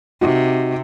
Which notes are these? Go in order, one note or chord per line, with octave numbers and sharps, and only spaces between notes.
C3 D#4 F#4